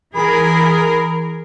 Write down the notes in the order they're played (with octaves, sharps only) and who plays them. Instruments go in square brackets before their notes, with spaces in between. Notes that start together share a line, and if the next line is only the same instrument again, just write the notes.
[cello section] E3 G#4 A#4 [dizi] B5